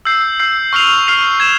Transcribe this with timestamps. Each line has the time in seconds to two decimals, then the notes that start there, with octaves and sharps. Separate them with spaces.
0.05 E6 G6 C7
0.39 E6 G6 C7
0.73 C#6 F6 C7 F7
1.07 C#6 F6 C7 F7
1.40 G#6 E7